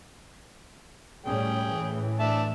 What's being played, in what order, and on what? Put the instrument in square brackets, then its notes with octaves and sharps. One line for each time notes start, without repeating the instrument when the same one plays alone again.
[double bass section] A2 G3 C#4 [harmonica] G#4 G5
[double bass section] A2 E3
[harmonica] D4 E5 A5